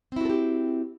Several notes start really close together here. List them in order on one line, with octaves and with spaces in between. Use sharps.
C4 E4 F#4 A4 G4